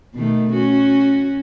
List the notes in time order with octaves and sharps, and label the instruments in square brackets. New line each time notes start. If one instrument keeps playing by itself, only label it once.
[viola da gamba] B2 D#3 A3
C#4 F#4